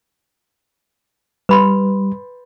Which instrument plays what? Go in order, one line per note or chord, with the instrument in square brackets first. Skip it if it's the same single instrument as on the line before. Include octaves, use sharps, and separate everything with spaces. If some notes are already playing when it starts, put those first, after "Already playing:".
[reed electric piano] G3 [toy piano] B4 B5 C6